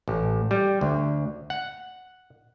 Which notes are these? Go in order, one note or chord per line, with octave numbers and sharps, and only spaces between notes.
A1
G3
D2
F#5